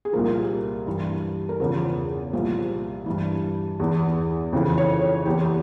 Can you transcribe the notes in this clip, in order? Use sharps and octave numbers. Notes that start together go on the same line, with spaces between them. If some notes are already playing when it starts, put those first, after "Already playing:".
G#4
C2 A#2 F3 A#4
G2 E3
A#4
E2 C#3 F3 C5
C2 A#2 F3
G2 E3
E2 E3
F2 C#3 E3
C#5
C#5
E2 E3 G4